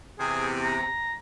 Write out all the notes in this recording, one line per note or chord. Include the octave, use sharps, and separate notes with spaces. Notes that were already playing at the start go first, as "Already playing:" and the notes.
E2 C3 G#4
A#5